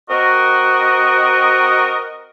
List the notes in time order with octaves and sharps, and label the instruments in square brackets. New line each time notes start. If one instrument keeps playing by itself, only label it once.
[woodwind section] C4 F#4 A#4 D#5